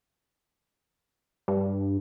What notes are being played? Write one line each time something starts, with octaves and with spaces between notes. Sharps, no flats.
G2